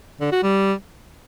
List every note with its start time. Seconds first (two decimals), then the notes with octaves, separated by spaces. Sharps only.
0.21 D3
0.32 F#4
0.43 G3